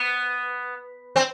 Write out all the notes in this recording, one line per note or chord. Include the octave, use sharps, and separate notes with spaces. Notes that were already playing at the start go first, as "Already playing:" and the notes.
Already playing: B3
C4